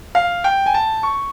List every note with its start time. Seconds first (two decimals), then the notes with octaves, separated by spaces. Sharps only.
0.15 F5
0.44 G5
0.66 G#5
0.74 A5
1.03 C#6